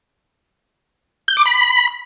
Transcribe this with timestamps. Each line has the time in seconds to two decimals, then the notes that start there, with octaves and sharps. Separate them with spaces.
1.28 G6
1.37 D6
1.46 B5